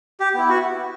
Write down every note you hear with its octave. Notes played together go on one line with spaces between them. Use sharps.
G4
B3 E4
F#4